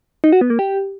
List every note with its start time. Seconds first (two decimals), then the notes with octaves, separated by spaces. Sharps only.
0.24 D#4
0.33 F#4
0.41 B3
0.50 A#3
0.59 G4